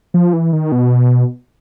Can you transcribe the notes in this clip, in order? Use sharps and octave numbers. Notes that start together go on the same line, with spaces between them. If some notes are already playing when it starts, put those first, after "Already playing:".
F3
E3
D#3
B2